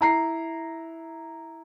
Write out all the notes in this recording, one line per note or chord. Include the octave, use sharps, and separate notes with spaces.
E4 A#5 C7